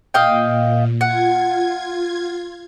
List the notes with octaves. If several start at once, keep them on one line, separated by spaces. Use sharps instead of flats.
A#2 D#5 F5 G5
F4 F#5 G#6